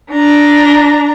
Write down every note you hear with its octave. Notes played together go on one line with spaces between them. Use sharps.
D4 A#5